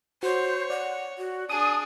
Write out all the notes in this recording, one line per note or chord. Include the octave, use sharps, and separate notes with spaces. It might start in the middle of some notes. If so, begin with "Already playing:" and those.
F#4 C5 C#5
D5 F#5
F#4
D4 G#4 A5 D#6